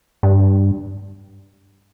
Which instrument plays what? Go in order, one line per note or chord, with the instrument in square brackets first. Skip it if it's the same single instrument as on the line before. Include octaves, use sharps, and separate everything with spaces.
[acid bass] G2